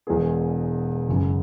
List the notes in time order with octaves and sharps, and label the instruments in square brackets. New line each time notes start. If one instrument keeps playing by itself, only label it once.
[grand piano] E1 E2 B2 B3 G#4
F#1 F#2 C#3